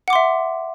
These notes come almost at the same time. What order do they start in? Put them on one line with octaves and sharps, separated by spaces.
F#5 D6 C6 E5